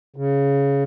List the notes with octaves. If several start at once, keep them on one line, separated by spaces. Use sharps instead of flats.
C#3